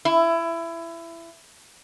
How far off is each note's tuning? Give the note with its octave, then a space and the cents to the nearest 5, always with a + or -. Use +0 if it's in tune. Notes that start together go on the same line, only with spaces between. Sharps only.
E4 +20